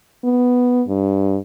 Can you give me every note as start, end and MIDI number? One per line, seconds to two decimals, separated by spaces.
0.24 0.83 59
0.88 1.38 43